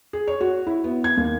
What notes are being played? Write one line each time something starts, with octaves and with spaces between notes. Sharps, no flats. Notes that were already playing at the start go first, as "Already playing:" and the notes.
G#4
C#5
F#4
E4
B3
G#6
D#2